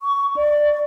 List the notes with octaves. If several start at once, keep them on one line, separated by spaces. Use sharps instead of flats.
C#6
D5